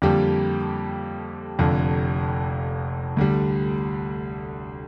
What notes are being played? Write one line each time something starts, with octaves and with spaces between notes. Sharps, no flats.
F2 D3 G3 A#3 G4
F1 F2 D3
D2 D3 G3